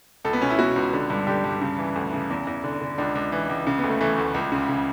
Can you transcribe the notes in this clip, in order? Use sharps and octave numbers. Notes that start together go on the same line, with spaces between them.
C#2 A4
B3
B2 C#4
E4
B2 F#4
C#2
D3
G2
D3 G4
G2
C#3
E3
D2
C#3
E2
E2
D3
D3
C#2 D4
C#2
E3
C#2
C#3
B3
D2
A3
E3 A3
D2
C#2
C#3
C#3